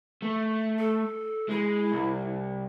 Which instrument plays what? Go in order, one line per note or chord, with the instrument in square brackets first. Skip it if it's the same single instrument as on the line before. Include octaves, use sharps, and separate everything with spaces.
[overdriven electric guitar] A3
[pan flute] A4
[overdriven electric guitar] G#3 [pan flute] E4
[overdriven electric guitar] C2